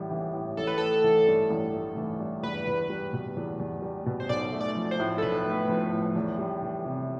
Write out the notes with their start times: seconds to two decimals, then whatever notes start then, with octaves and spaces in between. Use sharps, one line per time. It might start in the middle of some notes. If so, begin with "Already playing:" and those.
Already playing: A1 A2 E3 G3
0.11 E3
0.34 A2
0.57 A1 A4
0.67 B4
0.78 A3 A4
1.04 E3
1.27 G2
1.51 A1
1.74 A3
1.97 E3
2.20 G2
2.43 E2 B4
2.67 E2
2.90 G3
3.13 B2
3.37 E2
3.60 E2
3.82 G3
4.06 B2
4.20 C5
4.29 B1 D5
4.53 A3
4.61 D5
4.76 F3
4.91 C5
5.00 A2
5.18 A4
5.22 B1 B4
5.46 A3
5.69 F3
5.92 A2
6.15 E2
6.39 G3
6.62 E3
6.85 C3